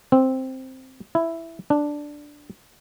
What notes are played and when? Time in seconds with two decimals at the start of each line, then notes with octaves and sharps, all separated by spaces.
0.12 C4
1.15 E4
1.70 D4